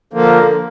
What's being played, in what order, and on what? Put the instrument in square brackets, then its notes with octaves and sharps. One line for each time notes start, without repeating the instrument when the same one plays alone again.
[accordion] D3 F3 A#3